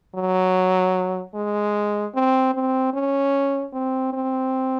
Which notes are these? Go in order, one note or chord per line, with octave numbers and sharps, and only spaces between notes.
F#3
G#3
C4
C4
C#4
C4
C4